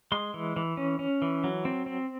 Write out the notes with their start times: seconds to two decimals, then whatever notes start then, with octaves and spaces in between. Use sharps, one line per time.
0.12 G#3 C6
0.34 E3
0.56 E3
0.77 C#4
0.99 C#4
1.22 E3
1.44 F#3
1.65 C4
1.86 C4